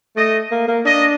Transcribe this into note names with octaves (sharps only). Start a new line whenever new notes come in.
A3 D#5
A#3
A#3
D4 D#5